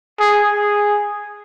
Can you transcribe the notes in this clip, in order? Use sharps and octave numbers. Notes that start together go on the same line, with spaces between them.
G#4
G#4